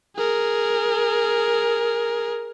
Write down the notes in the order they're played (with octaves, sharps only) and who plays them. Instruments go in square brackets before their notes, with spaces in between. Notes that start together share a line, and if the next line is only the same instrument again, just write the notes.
[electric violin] G#4 A#4